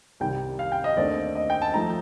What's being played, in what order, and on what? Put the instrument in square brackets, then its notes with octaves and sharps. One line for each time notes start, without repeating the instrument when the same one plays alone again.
[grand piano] C2 C3 D#3 G3 G5
F5
G5
D#5
D#2 D3 A3 C4 D5
D#5
G5
A5
F3 A3 D#4 A#5